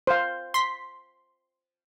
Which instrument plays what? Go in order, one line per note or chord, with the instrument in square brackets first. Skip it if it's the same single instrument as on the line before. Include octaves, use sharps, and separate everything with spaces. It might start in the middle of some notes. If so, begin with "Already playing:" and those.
[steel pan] C5 F5
[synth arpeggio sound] C6 B6